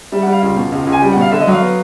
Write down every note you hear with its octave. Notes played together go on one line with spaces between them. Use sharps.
G3 E5
F#5
G3
F5
C#2
B2
C#2
C#2
G#5
G3 G5
F#5
B2 F5
D3 E5
D#5
F#3 F5
B3